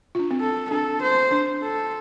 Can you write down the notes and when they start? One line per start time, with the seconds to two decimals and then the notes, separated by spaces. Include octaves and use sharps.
0.15 F4
0.19 D4
0.31 C4
0.41 A4
0.70 D4 A4
1.02 C5
1.32 D4
1.63 A4